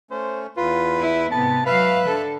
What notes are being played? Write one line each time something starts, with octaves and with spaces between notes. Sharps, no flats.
A3 C#4 C5
E2 F4 B4
E4
G#2 C3 B3 A5
F#3 B4 E5 F5 F#6
D3 A4